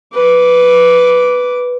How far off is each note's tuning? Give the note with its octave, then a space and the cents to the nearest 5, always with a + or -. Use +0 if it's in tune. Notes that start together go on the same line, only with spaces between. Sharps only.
B4 +0 D6 -15